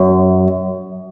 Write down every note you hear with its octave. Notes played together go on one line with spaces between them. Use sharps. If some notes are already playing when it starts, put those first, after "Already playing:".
Already playing: F#2